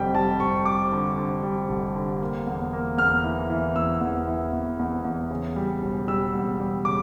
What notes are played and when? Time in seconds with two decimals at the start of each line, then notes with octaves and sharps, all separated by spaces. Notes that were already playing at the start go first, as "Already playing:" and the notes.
Already playing: F1 F2 D3 G3 G5
0.14 G3 A5
0.40 F1 C#6
0.66 G3 D6
0.92 D3
1.18 D3
1.43 G3
1.69 F1
1.95 D3
2.20 A#3
2.47 E2
2.73 A#3
2.98 E2 F6
3.24 E3
3.50 E3
3.76 E2 E6
4.01 E2
4.27 E3
4.52 E2
4.79 E2
5.04 E2
5.31 C#3
5.56 G3
5.82 E1
6.08 G3 E6
6.34 E2
6.60 G3
6.85 C#3 D6